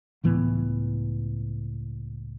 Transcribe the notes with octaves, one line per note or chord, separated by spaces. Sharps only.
C#2 A2 E3 B3